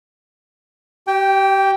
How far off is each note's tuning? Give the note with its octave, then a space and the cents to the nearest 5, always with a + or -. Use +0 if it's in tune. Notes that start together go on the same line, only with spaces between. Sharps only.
G4 -30 G5 +0